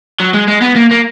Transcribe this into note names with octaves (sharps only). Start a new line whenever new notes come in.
F#3
G#3
G#3
B3
A#3
A#3